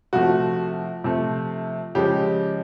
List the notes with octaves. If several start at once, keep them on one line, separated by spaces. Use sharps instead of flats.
C3 F3 A3 F#4
C3 F3 A3
C#3 F3 G#3 G4